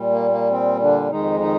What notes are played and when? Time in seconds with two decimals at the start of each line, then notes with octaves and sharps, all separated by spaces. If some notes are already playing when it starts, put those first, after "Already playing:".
Already playing: A#2 G3
0.11 A#3
0.31 A#3
0.51 C4
0.81 D3 D4
1.10 F2 D#3 G#3 D#4
1.40 D#3 D#4